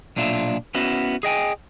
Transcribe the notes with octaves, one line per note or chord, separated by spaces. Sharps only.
B1 A#2 D4 F4 E5
B3 C#4 E4 F#4
G#4 D#5 G5 G#5